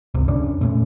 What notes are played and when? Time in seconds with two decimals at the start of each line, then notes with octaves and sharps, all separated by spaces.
0.14 G#1 C#2 C3
0.28 F2 C#4 D4
0.61 A#2 A3 C#4